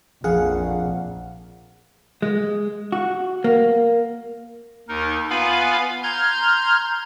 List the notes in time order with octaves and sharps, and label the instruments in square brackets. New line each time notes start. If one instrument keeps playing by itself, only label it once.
[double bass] A#1 [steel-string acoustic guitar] F2 [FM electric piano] G#4 F5 F#5
[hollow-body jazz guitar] G#3
F#4
A#3
[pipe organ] D#2 D#4 A#4
B3 F4 B4 F5 G#5 B5
A#5 C6 F6 G6 G#6